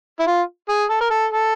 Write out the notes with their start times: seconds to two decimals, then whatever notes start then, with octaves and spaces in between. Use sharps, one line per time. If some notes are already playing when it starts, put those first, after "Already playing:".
0.20 E4
0.27 F4
0.69 G#4
0.90 A4
1.01 A#4
1.11 A4
1.32 A4